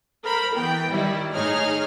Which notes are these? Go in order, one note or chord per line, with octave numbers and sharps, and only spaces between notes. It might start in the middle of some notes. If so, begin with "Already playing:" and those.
A#4 C5 B5
E3 B3 G5
D#3 G3 E4
A2 D#4 G#4 C#5 F6